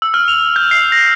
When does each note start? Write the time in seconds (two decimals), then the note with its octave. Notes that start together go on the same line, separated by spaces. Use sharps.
0.02 E6
0.14 F6
0.28 F7
0.56 G6
0.71 C7
0.92 A#6